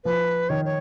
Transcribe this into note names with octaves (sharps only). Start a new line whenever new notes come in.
F3 B4
D#3 C#5
C#5